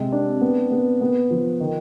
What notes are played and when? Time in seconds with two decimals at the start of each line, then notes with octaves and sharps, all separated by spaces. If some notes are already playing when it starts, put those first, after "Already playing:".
Already playing: C3 G#3
0.12 D4
0.41 B3
0.71 B3
1.01 B3
1.30 F3
1.60 D#3